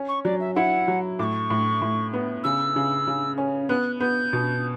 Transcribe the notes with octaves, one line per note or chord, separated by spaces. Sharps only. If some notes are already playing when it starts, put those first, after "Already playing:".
Already playing: C#4
C#6
F#3 D5
E5
E4 F#5
F#3
A2 C#6 D6
A2
A2
B3
C#3 E6
C#3
C#3
C#4
B3 F#6
B3 G6
B2